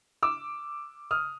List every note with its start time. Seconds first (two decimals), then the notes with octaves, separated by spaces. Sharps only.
0.23 D6 E6
1.11 D#6 F6